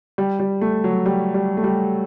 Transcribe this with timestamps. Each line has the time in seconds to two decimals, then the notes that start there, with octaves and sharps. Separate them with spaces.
0.18 G3
0.39 G3
0.61 A3
0.84 F#3
1.06 G3
1.34 G3
1.57 A3
1.64 G3